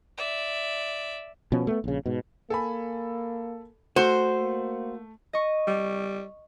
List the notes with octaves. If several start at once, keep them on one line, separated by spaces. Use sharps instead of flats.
D5 E5
B2 F3 C#4
A3 B3
A#1 C#3
G#2 B2
A#3 A4 G#5 B5
A3 F#4 C5
A#3
D#5 C#6
G3